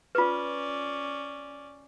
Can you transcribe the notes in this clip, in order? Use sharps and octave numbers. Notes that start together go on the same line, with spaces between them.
C#4 F4 B4 D5